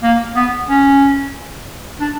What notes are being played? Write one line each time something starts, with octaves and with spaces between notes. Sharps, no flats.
A#3
B3
C#4
D4